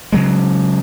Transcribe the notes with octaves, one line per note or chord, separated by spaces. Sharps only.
C#3 F#3 G#3